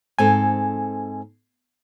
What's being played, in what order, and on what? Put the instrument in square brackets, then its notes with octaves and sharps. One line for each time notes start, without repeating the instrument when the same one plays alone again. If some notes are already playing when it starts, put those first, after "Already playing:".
[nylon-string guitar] G#2 C4 A4 [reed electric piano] G#5